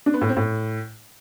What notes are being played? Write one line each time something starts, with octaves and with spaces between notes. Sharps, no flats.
D4
B3
A2
C4
A2